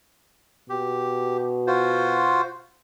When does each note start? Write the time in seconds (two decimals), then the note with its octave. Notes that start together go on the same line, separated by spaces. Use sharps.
0.70 B2 G4
1.67 F4 F#4 C5